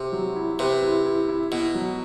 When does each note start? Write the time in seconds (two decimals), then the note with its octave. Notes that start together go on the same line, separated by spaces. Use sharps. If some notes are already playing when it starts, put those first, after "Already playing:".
Already playing: C3
0.12 F#3
0.36 E4
0.59 C3 B4
0.83 E4
1.06 E4
1.28 E4
1.52 B2 E4
1.75 F#3